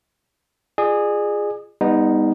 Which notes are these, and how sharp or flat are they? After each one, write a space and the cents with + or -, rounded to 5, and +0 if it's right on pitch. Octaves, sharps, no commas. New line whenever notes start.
F4 +0 G#4 -5 D5 +40
G3 +35 B3 +0 D#4 +5